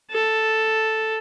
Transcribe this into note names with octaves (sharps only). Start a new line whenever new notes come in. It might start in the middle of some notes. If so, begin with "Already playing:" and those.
A4